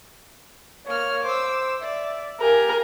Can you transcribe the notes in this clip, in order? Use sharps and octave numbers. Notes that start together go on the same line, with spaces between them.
A#3 C#5 F6
C5 D6 E6
D5 E5
G4 A#4 F5 G#5